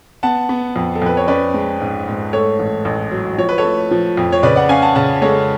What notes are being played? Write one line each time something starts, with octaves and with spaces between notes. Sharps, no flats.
B3 F#5 A5
B3
F2
A4
F2 B4
C#5
C#4 B4 D5
G#3
G#2
G#2
A3 A4 C#5
A1
A1
F#3
F3 C#5
B4
A4 C#5
A3
F3
F2
C#5
C#3 B4 D5
D5 F#5
C#4 F5 G#5
F#5 A5
C#3 F#5 A5
G#3 A4 C#5